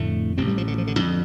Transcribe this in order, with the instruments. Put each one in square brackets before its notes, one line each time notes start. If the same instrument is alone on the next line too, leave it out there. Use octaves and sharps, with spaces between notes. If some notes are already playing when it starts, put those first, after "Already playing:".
Already playing: [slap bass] F1 F2 A2 D3 A3
A1 A2 C3 C4
G2 G3
F3
D3
F3
D3
F2 D3